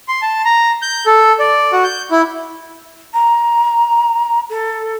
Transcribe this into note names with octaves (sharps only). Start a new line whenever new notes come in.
C6
A5
A#5
G6
A4
D5
F#4
G6
E4
A#5
A4